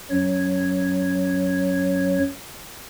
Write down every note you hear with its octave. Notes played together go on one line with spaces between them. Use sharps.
F#2 F#3 C#5